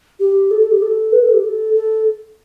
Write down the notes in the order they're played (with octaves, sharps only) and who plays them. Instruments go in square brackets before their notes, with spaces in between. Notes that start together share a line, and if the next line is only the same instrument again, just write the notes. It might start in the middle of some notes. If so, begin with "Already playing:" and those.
[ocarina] G4
A4
A4
G4
A4
B4
A4
G4
A4
A4